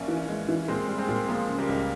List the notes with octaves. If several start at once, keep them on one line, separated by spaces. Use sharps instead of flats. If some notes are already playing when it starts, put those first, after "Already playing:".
Already playing: A#1 A#3 C#4
E3
G#3
E3
A#2 G#3 C4
G3
G#3 C4
A#2
F3 G#3 A#3
C#3
G3 A#3
C#2